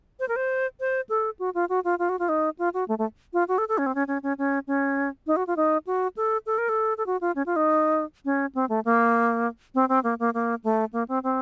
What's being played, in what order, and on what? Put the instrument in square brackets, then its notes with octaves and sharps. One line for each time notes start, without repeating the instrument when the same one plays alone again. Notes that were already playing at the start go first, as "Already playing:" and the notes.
[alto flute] C5
A#4
C5
C5
A4
F#4
F4
F#4
F4
F4
F#4
F4
D#4
F4
F#4
A3
A3
F4
F#4
A4
A4
C#4
C4
C#4
C#4
C#4
C#4
C#4
D#4
F#4
F4
D#4
F#4
A4
A4
A#4
A4
A4
F#4
F4
C#4
F4
D#4
C#4
C4
A3
A#3
C4
C4
A#3
A#3
A#3
A3
A#3
C4
C4